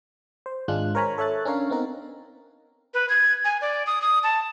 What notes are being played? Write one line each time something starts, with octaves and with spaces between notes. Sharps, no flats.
C5
G#1 G#3 D4 F4 F#6
A#4 C5 C#5 G#5 A#5 B5
A4 C#5 E5 F#6 A6
C#4 D4 A#4 C#5 F5
B3 C4 D#4 A#4
B4
G#6
G#5
D5
D#6
D#6
A5